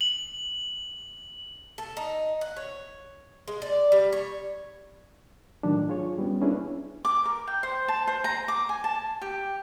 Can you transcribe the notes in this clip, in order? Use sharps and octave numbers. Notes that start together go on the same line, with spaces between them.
F#7
A4
D#4
F#5
C#5
G#3
D5
G3
C#5
A2 D#3 F3 F#3 D4
F4 G#4 C#5
G3 B3 C#4
A#3 C#4 D4 E4 G#4 B4
D6
A#4
G5
C5
A5
C5
A#5
D6
G#5
A5
G4